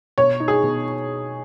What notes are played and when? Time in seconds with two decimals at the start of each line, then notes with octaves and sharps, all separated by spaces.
0.18 B2 C#5
0.40 D#4
0.48 G#4
0.63 B2